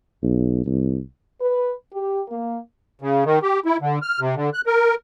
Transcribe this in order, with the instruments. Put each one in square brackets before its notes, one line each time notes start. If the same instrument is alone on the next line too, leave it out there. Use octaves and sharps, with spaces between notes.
[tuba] B1
C2
[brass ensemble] B4
G4
A#3
[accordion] C#3
D#3
G4
E4
D3
F6
C3
D3
F#6
A#4